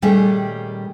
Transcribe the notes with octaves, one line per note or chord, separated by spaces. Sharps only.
A#2 D#3 G3 A3 C#4 G#4